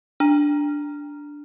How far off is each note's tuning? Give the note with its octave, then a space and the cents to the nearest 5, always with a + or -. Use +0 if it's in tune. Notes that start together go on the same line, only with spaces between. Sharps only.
D4 +0 A#5 +0